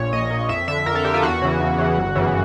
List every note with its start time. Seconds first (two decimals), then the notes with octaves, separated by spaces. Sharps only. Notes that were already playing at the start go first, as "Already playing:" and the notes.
Already playing: A#1 A#2 C#5
0.13 A#1 D#5
0.30 A#2
0.49 F2 E5
0.68 D3 E5
0.86 F2 A#4
0.95 A4
1.04 D3 G4
1.14 F4
1.23 E2 F#4
1.42 C#3 E3
1.60 E2
1.78 C#3 E3
1.98 G1
2.15 F#2 C#3 E3